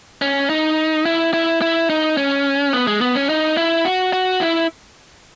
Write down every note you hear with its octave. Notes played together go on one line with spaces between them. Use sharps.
C#4
D#4
E4
E4
E4
D#4
C#4
B3
G#3
B3
C#4
D#4
E4
F#4
F#4
E4